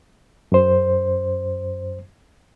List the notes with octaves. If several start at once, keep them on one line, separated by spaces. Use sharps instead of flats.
F#2 C5